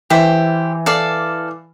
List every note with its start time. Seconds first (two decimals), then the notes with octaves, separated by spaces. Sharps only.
0.10 E3 G4 C5 E5
0.86 A4 D5 F5